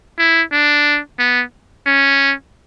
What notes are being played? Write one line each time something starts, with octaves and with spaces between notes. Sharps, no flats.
E4
D4
B3
C#4